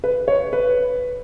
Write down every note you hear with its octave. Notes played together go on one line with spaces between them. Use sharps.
B4
C#5
B4